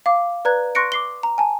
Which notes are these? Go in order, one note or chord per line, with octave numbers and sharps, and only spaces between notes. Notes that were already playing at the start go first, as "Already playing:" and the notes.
F5 D6
B4 D5 A#5 F#6 G#6
C6 C#6 F#6 A#6 C#7 D7
D6 C7 G7
A#5
G#5 A5